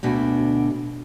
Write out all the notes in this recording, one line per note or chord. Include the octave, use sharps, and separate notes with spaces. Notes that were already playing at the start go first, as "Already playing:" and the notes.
D2 B2 D3